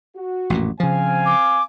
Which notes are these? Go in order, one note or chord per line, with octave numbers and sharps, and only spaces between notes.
F#4
A1 F2 A#2
C#3 F3 C4 F5 G#5
D6